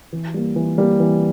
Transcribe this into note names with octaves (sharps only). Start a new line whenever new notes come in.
E3
G3 A#3
E3
G3 A#3
E3